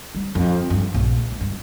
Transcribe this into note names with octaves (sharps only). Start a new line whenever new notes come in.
G3
F2
G2
A#1
C#2
G2